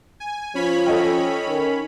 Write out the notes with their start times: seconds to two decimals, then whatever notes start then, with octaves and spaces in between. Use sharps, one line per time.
0.20 G#5
0.55 F3 C#4 C#5 B5
0.86 A4 D#5 G5
1.48 D#3